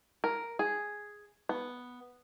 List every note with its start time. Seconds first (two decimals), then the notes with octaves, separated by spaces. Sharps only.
0.24 A#4
0.59 G#4
1.49 B3